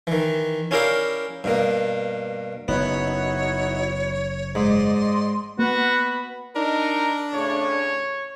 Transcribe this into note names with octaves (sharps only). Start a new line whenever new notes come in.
D#3 E3
C#4 E4 G4 A#4 D5 F5
G2 B2 A#3
F#1 B3 D#4 E4 F#4 C#5
G#2 D5 D#5 C6
A#3 B3 F#4 B5
D4 D#4 A#4
A2 C#3 A3 C#5